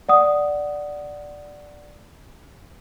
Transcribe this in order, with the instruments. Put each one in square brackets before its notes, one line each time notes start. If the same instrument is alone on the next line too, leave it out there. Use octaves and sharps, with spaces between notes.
[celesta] D5 F#5 D#6